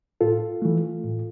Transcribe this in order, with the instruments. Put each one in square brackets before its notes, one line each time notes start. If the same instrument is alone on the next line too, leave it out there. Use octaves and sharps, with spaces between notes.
[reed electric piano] A2 F4 A4
E3 A3
A2